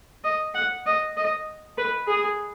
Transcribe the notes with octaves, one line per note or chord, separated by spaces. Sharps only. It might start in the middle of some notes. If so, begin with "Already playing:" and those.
D#5
F#5
D#5
D#5
B4
G#4